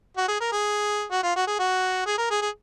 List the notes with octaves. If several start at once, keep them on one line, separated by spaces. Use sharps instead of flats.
F#4
G#4
A#4
G#4
F#4
F4
F#4
G#4
F#4
G#4
A#4
G#4
G#4